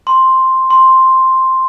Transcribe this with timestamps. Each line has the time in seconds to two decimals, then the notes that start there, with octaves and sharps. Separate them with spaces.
0.07 C6
0.70 C6